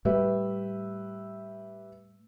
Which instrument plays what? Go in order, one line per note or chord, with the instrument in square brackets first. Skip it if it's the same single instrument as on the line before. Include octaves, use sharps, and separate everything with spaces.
[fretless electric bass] A2 G3 A3 [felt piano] G4 B4 E5